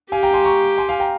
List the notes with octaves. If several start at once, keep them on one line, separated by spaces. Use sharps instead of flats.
G4 F5 G#5
G5 A#5
G#5 C6
A#5 C#6
G#5 C6
F5 G#5
G5 A#5